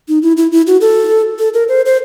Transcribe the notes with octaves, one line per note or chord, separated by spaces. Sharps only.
D#4
E4
E4
E4
F#4
A4
A4
A#4
C5
C5